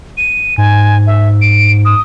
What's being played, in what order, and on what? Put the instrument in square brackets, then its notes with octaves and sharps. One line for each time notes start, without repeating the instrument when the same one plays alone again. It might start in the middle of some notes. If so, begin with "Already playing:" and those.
[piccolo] D#7
[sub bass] G#2 [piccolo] G#5
[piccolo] E5
D7
D#6